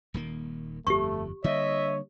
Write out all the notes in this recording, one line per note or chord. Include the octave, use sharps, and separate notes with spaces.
D#1 D#3 A#3
G1 F2 A3 G4 C#6
D3 G3 A#3 C#5 D#5 E5